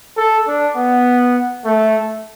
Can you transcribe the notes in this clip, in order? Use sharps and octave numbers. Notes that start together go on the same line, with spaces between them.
A4
D4
B3
A3